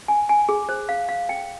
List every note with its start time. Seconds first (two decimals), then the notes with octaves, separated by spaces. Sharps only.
0.08 G#5
0.29 G#5
0.49 G#4
0.69 C5
0.89 F5
1.09 F5
1.29 G5